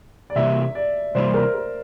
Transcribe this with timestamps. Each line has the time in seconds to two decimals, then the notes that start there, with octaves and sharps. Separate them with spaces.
0.30 D5
0.36 C3 E3 G3 A#3 E5
0.75 D5
1.15 C3 E3 G3 A#3 C5
1.34 A#4
1.55 A#4